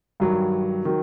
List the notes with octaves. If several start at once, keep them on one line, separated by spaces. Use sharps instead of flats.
G2 D#3 F#3
D#3 F#3